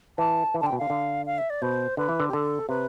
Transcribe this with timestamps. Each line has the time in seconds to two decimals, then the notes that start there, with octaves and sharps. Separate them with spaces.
0.18 E3 A5
0.54 E3
0.61 A5
0.63 D3
0.66 G5
0.72 B2
0.78 D3 F5
0.90 D3
1.26 F5
1.38 E5
1.50 D5
1.62 B2 C5
1.97 D3 B4
2.09 E3
2.20 D3
2.28 G4
2.33 D3 A4
2.69 C3 B4